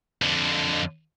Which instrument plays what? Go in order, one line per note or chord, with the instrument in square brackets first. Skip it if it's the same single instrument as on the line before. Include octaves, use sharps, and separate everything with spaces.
[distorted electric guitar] F2 D3